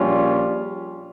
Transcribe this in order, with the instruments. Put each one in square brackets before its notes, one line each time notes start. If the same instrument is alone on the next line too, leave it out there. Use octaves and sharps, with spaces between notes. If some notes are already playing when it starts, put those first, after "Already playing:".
Already playing: [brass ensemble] A#1 A#2 G3 C#4 F4